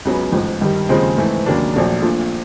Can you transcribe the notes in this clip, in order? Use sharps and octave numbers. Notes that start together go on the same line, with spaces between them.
C#2 C#3 F#3 B3
A1 G#2 F3
G2 D#3 G3
D#2 C#3 F3 G#3 C4
G#2 E3 A3 C4
D#2 C#3 F#3 A#3 D4
A#1 A#2 F#3 A3 D4
A#2 F3 A3 D4 F4